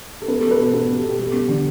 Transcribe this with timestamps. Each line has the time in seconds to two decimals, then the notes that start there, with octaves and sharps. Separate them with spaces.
0.22 A4
0.28 B3 B4
0.40 B3 A4
0.51 B4
0.59 B2 A4
0.73 B3 B4
0.89 B3
0.96 A4
1.03 B2 G4
1.19 G3 A4
1.33 B3
1.48 D3